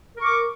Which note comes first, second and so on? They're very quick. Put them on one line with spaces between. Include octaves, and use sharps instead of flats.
A#4 C#6 D6